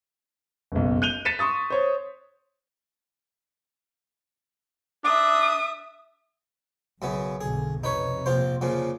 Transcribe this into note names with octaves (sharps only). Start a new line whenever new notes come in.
F#1 B1
F#6 G6 D#7 F7 G7
A6 B6 C#7 D#7 E7
C6 C#6 D#6 A6
C5 C#5
D4 E5 D#6
B1 F#2 C#3 B3
B1 G2 D3 G#4
F2 C3 D#4 B4 C#5
A#1 F4 C5
A#2 C#3 F3